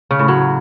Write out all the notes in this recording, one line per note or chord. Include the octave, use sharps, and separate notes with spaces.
C#3
A2
F#3